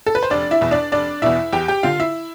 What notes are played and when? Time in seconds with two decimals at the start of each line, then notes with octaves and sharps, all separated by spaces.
0.06 A4
0.15 B4
0.23 C5
0.30 F1 D4 D5
0.51 E4 E5
0.61 E2 B2
0.71 D4 D5
0.92 F1 D4 D5
1.22 E2 B2 E4 E5
1.53 E2 G4 G5
1.68 G4 G5
1.83 D3 F4 F5
2.00 E4 E5